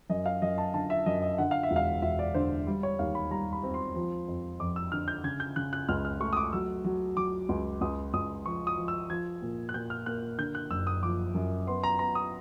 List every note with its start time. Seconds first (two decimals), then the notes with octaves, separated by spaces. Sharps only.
0.10 F#2 D#5
0.26 F5
0.42 F#2 D#5
0.58 A5
0.74 D3 A5
0.90 E5
1.06 F#2 D#5
1.22 D#5
1.38 D3 F#5
1.51 F5
1.63 E5
1.71 E1
1.76 F5
2.02 E1 E5
2.19 D5
2.35 D3 C5
2.67 G3
2.83 C#5
2.99 D#2 F5
3.15 B5
3.31 G3 A#5
3.53 B5
3.63 C4
3.74 C6
3.95 F3
4.28 F2
4.60 F2 D6
4.76 E6
4.92 D3 F6
5.08 G6
5.24 C#3 G#6
5.40 G6
5.56 C#3 F#6
5.73 F#6
5.89 C#2 F6
6.05 F6
6.20 A3 C#6
6.33 D#6
6.37 D6
6.53 F#3 E6
6.85 F#3
7.17 F#3 D6
7.49 C#2
7.81 C#2 D#6
8.14 C#2 D#6
8.46 F3 C#6
8.67 D#6
8.78 F3
8.88 E6
9.10 F3 G#6
9.42 A#2
9.69 F#6
9.74 A#2 G6
9.90 F6
10.06 A#3 F#6
10.38 D3 G6
10.55 F#6
10.71 F#1 E6
10.87 D#6
11.03 F3 D6
11.35 F#2
11.67 B3 C6
11.84 A#5
11.99 B3 A#5
12.15 D#6